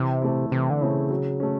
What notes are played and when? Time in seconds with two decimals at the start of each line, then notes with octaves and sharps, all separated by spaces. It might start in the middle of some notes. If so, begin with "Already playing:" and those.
Already playing: C3 E3
0.22 A3 C4 E4
0.52 C3 E3
0.70 D3
0.81 C#3 A3 C4 E4
1.10 F#3
1.40 A3 C#4